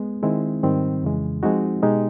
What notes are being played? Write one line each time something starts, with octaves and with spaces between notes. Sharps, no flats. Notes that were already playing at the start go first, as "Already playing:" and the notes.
Already playing: G#3 B3
D#3 G#3 C4 E4
G#2 D#3 G3 C4
F2 C#3 E3 G#3
F3 G#3 C4 D#4 F#4
B2 G#3 B3 D#4 G4